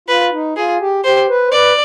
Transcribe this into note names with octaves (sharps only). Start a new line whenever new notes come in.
F4 B4
D#4
F4 G#4
G4
G4 C5
B4
C5
B4 D5